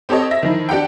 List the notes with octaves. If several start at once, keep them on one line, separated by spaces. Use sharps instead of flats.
C4 G4 A4 C#5 D#5
E5 A#6
D#3 F3 E4
D4 G4 F#5 G5